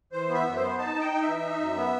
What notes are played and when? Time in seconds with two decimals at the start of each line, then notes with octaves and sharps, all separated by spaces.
0.12 E3 C5
0.29 B3
0.34 E5
0.46 F#2
0.56 C5
0.62 B3
0.78 D#4 A5
0.95 D#4 G5
1.12 D#4
1.22 E5
1.27 E3
1.44 D#4
1.60 F#2
1.77 B3